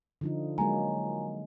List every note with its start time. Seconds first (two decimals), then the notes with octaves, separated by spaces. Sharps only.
0.21 D3 F3 D#4
0.58 F#3 G#3 A#3 G#5 A#5